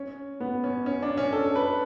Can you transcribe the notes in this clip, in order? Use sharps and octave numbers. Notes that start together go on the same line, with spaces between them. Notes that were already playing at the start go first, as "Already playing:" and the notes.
Already playing: C#4
B3
C#4
C#4
D4
C#4
A4
B4